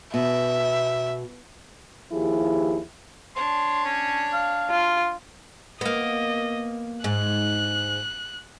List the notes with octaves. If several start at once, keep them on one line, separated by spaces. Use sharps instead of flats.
B2 E5
D#2 F3 E4 G4 G#4
D4 C#5 C6
C#4
F5
F4
A#3 B3 D#5
G#2 F#6